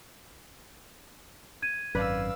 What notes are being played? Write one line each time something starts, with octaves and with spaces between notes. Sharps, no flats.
G#6 D#7
G#1 F#2 B4 D5 F5 E6